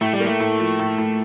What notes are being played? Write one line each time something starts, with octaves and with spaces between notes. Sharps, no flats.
A2 A3
G3
A3 A#3
A2
F3
A2
A2